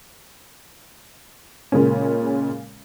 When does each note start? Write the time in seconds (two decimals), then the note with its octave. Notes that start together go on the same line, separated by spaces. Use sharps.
1.72 A#2 C#3 G#3 A#3 C#4